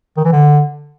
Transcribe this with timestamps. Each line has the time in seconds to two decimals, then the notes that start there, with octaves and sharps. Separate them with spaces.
0.17 D#3
0.25 E3
0.32 D3